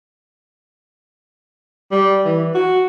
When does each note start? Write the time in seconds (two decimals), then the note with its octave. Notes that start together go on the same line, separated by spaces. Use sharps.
1.92 G3
2.25 E3
2.55 F#4